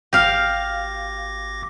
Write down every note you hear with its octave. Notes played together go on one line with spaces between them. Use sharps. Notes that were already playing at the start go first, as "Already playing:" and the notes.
G#1 G4 F5 D6 A#6